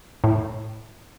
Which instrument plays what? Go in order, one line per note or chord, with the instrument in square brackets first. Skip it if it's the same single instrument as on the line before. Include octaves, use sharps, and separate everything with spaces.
[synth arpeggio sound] A2